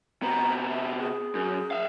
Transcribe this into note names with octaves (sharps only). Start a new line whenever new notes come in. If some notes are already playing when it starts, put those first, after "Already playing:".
C3 B3 A#5
E5
G#4
F#2
E5 F5